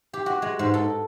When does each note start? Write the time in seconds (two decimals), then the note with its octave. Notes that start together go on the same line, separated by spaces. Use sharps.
0.13 G4
0.26 F#4
0.42 G#3
0.59 G#2
0.74 A4